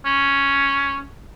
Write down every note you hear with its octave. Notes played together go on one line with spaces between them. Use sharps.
C#4